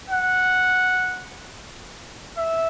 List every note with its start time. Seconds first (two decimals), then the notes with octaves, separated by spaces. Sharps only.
0.10 F#5
2.37 E5